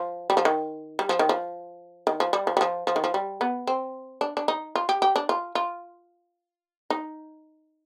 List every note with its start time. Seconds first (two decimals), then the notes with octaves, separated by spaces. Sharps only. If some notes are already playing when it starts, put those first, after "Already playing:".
Already playing: F3
0.30 G3
0.37 F3
0.45 D#3
0.99 G3
1.09 F3
1.19 D#3
1.29 F3
2.07 D#3
2.20 F3
2.33 G3
2.47 F3
2.57 G3
2.61 F3
2.87 F3
2.96 D#3
3.04 F3
3.14 G3
3.41 B3
3.67 C4
4.21 D4
4.37 D4
4.48 D#4
4.75 F4
4.89 G4
5.02 G4
5.16 D4
5.29 F4
5.55 F4
6.90 D#4